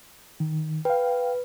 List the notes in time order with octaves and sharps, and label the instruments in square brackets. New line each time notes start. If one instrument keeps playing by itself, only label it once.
[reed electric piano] D#3
[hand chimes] B4 [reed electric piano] F5 G5